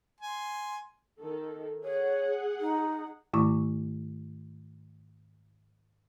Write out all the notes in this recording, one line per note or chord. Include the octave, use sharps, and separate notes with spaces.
G#5 C6
D#3 A4
G#4 C#5 F#5
D#4
G#2 D#3 A3 E4 C#6 D6